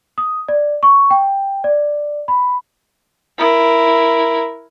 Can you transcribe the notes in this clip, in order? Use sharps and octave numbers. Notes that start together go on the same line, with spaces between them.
D#6
D5
C#6
G5
D5
B5
E4 A#4